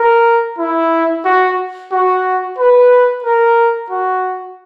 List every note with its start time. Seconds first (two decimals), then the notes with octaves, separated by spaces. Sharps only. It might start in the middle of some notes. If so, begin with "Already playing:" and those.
Already playing: A#4
0.58 E4
1.25 F#4
1.92 F#4
2.59 B4
3.24 A#4
3.90 F#4